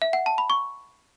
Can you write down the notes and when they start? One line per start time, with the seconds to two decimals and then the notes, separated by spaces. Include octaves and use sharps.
0.02 E5
0.13 F#5
0.26 A5
0.38 B5
0.50 C#6